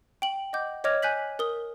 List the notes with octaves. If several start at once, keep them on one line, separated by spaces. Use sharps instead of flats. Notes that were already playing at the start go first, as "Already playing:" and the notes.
G5 F#7
D#5 F#5 D6 G6
C#5 D#5 D6 F6 G#6 F7
G#5 F#6 G6 B6 F#7
A#4 D#6 G7